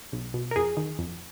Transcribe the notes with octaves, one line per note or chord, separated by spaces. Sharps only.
B1
B2
A#4
F2 G#4
D#3
F2